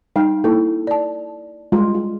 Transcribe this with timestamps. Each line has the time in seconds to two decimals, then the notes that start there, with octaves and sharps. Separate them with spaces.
0.16 G3 D#4 F5 G5
0.44 A#3 E4 A4
0.87 D5 A5
1.72 G3 G#3 F4
1.95 F4